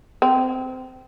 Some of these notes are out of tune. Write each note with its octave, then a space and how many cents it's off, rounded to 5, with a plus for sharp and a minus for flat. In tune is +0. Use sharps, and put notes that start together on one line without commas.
C4 -20